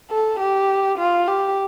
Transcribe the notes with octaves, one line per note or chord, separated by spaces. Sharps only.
A4
G4
F4
G4